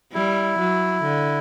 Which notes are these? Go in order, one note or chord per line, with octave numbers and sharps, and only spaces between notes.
G3 E4
F#3
D3